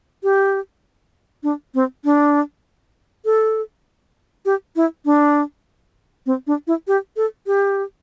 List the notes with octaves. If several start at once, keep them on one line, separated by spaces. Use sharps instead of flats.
G4
D4
C4
D4
A4
G4
E4
D4
C4
D4
E4
G4
A4
G4